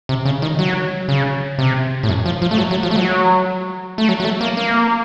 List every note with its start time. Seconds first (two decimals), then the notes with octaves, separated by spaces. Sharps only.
0.09 C3
0.25 C#3
0.42 D#3
0.59 F#3
1.08 C#3
1.58 C3
2.03 A2
2.09 F#2
2.26 F3
2.42 F3
2.51 A3
2.58 F#3
2.71 F#3
2.83 F3
2.91 A3
2.96 F#3
3.98 A3
4.09 F#3
4.20 F#3
4.25 A3
4.41 A#3
4.57 A#3